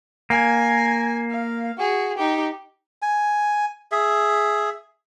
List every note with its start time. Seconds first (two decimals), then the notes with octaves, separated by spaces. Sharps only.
0.30 A#3 G#5
1.30 F5
1.77 F#4 G#4
2.17 D#4 G4
3.02 G#5
3.92 G#4 E5